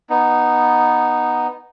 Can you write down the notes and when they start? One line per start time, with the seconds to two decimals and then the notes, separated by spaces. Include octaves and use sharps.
0.10 B3 D#4